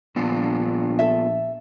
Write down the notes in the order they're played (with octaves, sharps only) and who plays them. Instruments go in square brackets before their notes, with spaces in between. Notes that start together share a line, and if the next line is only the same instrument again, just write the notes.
[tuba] A#1 [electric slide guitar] B3 D4 F4
[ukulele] A4 E5